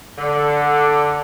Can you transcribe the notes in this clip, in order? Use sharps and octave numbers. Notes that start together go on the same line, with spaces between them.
D3